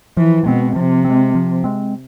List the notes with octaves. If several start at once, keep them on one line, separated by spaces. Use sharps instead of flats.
E3 F3
B2 G#3 C4
C3 F3
G#3 C4
F3
G#3 C4